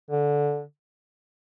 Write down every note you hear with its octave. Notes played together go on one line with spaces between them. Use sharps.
D3